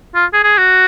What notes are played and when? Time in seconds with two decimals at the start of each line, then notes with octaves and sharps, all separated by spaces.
0.15 F4
0.33 G#4
0.43 G#4
0.58 F#4